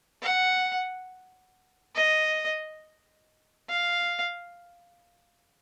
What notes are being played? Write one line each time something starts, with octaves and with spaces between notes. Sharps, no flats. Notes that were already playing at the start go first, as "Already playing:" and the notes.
F#5
D#5
F5